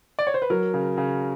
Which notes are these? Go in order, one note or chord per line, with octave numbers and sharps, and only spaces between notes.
D5
C#5
C5
B4
F#3 A#4
C#3
C#3